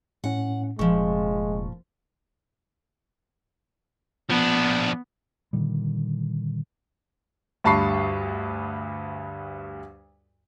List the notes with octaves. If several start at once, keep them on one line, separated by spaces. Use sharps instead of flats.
A2 C#4 F#5
F1 A#2 F3 G#3 C#6
F3 B3 D4
A#2 D3 D#3 G3
D2 G2 A5 B5 C#6 C7